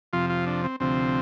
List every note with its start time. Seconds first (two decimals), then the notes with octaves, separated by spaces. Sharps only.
0.13 F2 C3 F3 F4
0.30 F4
0.47 D4
0.64 C4
0.80 D2 C3 F3 C4